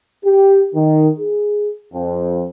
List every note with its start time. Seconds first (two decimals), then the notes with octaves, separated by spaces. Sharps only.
0.25 G4
0.75 D#3
1.20 G#4
1.94 F2